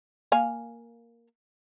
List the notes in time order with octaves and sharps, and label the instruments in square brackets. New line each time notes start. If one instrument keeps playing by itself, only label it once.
[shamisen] A#3 F5 G#5